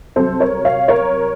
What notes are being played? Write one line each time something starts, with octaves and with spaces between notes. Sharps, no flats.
C2 C3 F#3 A4 C5
A#4 C#5
C#5 F5
A#4 C#5